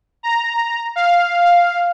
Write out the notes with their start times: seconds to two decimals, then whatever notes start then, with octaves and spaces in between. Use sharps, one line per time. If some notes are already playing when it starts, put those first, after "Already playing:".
0.23 A#5
0.96 F5